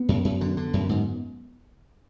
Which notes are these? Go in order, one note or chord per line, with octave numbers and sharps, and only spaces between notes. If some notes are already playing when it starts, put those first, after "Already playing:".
Already playing: B3
F#2
F#2
D3
D3
F#2
G#2